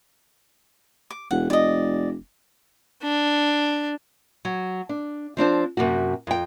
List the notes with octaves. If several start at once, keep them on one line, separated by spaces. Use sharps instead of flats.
D6
E1 F#5
F1 D5 D#5
D4
F#3
D4
F3 C4 D4 C5
F#2 C3 A#3 F#4
F2 G5